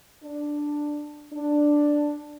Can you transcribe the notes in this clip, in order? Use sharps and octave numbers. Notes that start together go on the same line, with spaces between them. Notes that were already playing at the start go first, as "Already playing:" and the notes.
D4
D4